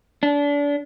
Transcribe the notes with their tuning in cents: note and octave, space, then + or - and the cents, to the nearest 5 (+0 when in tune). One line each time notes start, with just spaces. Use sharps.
D4 -30